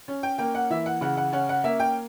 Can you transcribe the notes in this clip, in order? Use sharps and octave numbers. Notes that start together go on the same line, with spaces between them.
C#4
G5
A#3 G5
F#5
E3 E5
F#5
C#3 F#5
F#5
C#4 F#5
F#5
A#3 E5
G5